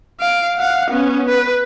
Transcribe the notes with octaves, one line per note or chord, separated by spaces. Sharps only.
F5 D7
F5 F#5
B3 C#4
B4